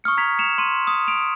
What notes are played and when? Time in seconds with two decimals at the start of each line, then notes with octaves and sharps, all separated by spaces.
0.04 C#6 D#6 F6 C#7
0.17 A#5 G#6 B6 F7
0.39 C#7 E7 F7
0.58 C6 D#7
0.87 D#6
1.08 D7 F7